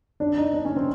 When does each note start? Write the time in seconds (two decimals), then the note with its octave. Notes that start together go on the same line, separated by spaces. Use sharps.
0.20 D4
0.38 D#4
0.53 D4
0.65 C#4
0.76 C4